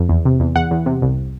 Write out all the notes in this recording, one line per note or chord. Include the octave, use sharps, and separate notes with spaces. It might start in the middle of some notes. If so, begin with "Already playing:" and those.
Already playing: F2
E2
C3
E2
E2 F#5
E2
C3
C2